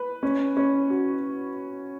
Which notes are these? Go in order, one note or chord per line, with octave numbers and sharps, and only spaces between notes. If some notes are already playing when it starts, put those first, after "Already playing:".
Already playing: B4
C#4
C#4
F#4